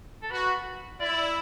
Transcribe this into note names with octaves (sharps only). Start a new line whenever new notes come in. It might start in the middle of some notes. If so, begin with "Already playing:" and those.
A4
F#4 B4
E4 D5